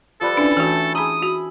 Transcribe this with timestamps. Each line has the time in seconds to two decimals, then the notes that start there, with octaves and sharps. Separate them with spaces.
0.21 F3 G3 A4 B4
0.37 C#4 D4 E4 G#5 C6
0.57 E3 A3 F#4 G5
0.95 G#4 E5 A#5 B5 D#6
1.22 F#4 B5